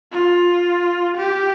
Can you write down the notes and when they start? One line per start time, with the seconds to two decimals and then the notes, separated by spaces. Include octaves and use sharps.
0.12 F4
1.17 G4